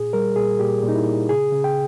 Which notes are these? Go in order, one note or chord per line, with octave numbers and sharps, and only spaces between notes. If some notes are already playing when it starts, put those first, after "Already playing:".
Already playing: A#2 G#4
G3 A#4
A#2 G#4
A#2 G4
A#2
D#4
E4
A#2
C#3 G#4
C#3
G5